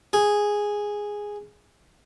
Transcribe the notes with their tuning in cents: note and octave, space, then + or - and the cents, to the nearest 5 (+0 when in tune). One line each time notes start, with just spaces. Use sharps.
G#4 -5